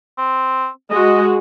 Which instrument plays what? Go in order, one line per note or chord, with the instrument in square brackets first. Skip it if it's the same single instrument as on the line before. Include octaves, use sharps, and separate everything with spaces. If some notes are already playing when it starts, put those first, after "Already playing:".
[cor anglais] C4
[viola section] G#3 F#4 [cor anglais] D#5